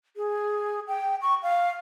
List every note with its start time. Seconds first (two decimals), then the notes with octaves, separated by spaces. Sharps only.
0.17 G#4
0.88 G5
1.22 C#6
1.43 F5